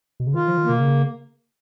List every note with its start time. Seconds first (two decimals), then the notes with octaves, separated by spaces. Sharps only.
0.20 B2
0.27 C#3
0.34 D#3 F4
0.48 F3
0.57 D#3
0.65 B2 A#3
0.79 C#3